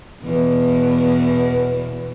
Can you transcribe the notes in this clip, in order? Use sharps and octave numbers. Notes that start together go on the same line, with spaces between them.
E2 B2 E3